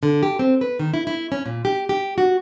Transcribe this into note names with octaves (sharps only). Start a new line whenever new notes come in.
D3
G4
C4
B4
D#3
E4
E4
C#4
A#2
G4
G4
F#4